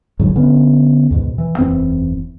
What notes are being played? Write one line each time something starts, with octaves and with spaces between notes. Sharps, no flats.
G#2 D3 F#3 G3
D3 B3 C#4
D#2 G#2 B2
E3
E1 F#2 E3 C4